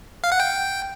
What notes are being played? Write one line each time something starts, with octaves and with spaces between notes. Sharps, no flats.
F5
F#5
G5